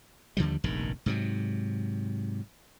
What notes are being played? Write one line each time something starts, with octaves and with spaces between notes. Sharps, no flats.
D#2 D3 F3 G3
F1 A#1 G2 D#3
G#2 C3 F#3